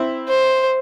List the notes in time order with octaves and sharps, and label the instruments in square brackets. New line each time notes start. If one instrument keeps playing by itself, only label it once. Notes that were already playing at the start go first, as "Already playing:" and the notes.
Already playing: [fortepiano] C4 E4
[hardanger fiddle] C5